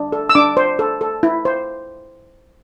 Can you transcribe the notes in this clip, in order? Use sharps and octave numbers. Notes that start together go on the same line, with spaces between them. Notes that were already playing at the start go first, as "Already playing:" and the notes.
Already playing: D4
A4
E6
D4 D6
C5
A4
A4
E4
C5